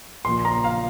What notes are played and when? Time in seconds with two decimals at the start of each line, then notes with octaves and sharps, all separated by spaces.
0.25 A#1 A#2 F3 C6
0.45 A#5
0.64 F5